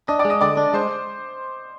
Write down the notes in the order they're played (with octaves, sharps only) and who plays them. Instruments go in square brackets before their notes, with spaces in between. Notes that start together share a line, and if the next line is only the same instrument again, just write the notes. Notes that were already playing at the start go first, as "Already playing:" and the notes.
[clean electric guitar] D4 [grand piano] D#5 D#6
[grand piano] D5 D6
[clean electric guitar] G#3
[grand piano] D#5 D#6
[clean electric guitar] D3 [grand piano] D5 D6
[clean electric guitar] D4
[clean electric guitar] G#3 [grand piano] C5 C6